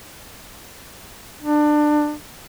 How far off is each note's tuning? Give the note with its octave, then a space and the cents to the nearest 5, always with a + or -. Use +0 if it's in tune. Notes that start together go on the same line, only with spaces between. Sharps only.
D4 +25